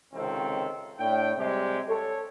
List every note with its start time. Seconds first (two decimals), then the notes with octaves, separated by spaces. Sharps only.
0.13 C#2 C3 D#3 C4 A4
0.98 A2 D4 G5
1.37 C3 G3 G#3 G4
1.88 A4 C#5